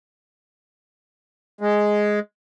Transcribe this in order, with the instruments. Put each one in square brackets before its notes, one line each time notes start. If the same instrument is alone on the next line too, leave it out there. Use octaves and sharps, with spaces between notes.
[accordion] G#3